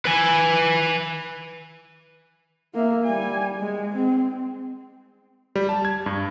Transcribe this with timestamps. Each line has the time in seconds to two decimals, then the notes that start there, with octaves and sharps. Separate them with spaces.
0.05 B4 G#5
2.74 A#3 E5
3.04 G3 G#5
3.58 G#3
3.95 C4
5.56 G3
5.69 A5
5.85 G#6
6.06 G2